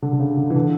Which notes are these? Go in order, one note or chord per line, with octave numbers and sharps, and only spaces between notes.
D3
D3
C#3
D3
E3
D3